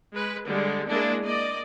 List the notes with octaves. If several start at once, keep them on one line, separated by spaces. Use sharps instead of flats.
G#3 B4
D3 G3 G#3
G#3 A#3 D4 E4 G#4
A#3 D5 D#5